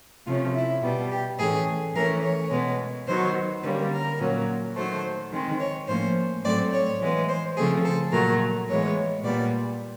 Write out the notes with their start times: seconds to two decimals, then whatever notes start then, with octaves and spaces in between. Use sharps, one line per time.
0.26 C3 F3 A3 C#4 F4
0.55 E4
0.83 B2 G3 B3
1.11 G4
1.39 A2 E3 A3 C#4 G#4
1.95 E3 A3 C#4 A#4
2.23 C#5
2.51 B2 G#3 B3
3.07 D#3 F#3 B3 C5
3.63 D3 G3 A#3 C#4 B4
3.91 A#4
4.20 A#2 F#3 A#3 C#4
4.76 D#3 F#3 A3 C5
5.32 D#3 G#3 C4
5.60 C#5
5.88 A2 F3 A#3 C#4 C5
6.44 A2 F#3 A3 C4 D5
6.73 C#5
7.00 E3 G#3 B3
7.28 C5
7.57 C#3 F3 A3 C4 G#4
7.85 A4
8.12 A#2 F#3 A3 A#4
8.68 A2 E3 G#3 B3 C#5
9.24 A#2 G3 B3 D5